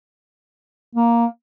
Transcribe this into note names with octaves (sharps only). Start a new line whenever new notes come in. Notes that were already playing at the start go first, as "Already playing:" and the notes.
A#3